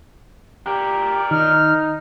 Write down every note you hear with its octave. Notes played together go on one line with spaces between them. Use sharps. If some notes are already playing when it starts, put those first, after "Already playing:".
G4 A#4 D5
D#3 D#4 F6